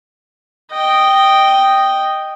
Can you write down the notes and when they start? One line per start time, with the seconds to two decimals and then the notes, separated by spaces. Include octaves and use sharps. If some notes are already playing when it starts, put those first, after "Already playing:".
0.71 D#5 G5